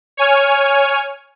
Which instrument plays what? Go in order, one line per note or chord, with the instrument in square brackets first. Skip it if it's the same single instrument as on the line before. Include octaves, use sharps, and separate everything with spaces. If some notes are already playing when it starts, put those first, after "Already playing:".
[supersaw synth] C#5 G#5 F6